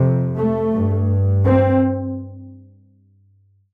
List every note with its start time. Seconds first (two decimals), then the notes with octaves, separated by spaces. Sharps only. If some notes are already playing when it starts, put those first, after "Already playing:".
Already playing: F2 C3
0.36 A3
0.71 G2
1.45 C4